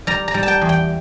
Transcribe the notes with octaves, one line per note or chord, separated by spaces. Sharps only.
G3 A#5
A#5
G3
A5
G5
E2
G5